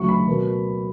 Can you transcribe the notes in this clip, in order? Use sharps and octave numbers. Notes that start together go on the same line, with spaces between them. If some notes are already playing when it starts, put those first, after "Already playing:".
Already playing: D2 C#3 F#3 C#6
B5
B2 F#3 A#3